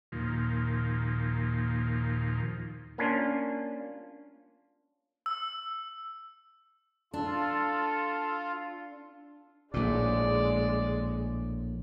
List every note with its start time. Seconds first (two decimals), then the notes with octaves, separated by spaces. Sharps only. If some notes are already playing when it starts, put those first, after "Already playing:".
0.12 D#2 A#2 F3
2.98 A#3 C#4 D4 F4
5.26 E6
7.14 D4 F4 A4
9.74 A#1 A2 G#3 D5